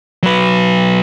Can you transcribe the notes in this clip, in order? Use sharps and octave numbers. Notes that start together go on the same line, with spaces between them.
F#3 B4